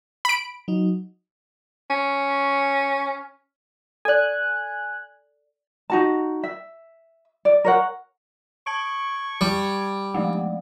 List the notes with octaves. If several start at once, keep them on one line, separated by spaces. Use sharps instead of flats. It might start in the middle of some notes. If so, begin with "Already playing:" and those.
B5 D7
F#3 D#4
C#4
A4 D5 G#5 F#6
D#4 F#4 A5
E5
D5
A#4 C#5 F#5
A5 C#6 G#6 D7
G3
F3 G#3 A3